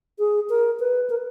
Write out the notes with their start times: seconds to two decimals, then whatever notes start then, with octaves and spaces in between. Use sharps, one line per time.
0.19 G#4
0.50 A#4
0.80 B4
1.10 A#4